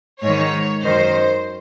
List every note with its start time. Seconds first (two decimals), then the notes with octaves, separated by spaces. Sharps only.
0.22 G#2 D#3 C#5
0.83 F#2 D#3 C5